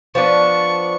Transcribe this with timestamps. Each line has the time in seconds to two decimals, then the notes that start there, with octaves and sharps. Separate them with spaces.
0.15 F3 B3 D4 C#6